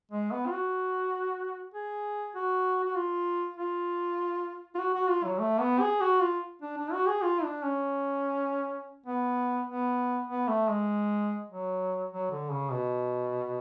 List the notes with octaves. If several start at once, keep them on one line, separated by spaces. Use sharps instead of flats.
G#3
B3
F4
F#4
G#4
F#4
F#4
F4
F4
F4
F#4
F#4
F4
F#3
A3
B3
G#4
F#4
F4
D4
D4
F#4
G#4
F4
D4
C#4
B3
B3
B3
A3
G#3
F#3
F#3
D3
C#3
B2